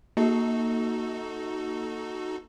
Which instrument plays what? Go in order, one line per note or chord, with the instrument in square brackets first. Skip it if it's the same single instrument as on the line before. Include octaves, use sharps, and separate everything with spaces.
[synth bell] A#3 [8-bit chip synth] D#4 F#4 A4